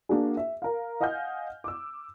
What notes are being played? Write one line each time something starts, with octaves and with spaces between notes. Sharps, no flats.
A#3 D4 F#4 G#4
E5
A#4 F5
D#5 F5 F#5 G#5 F6 G6
D6 E6